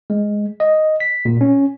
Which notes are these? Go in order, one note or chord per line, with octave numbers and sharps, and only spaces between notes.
G#3
D#5
B6
A#2
C#4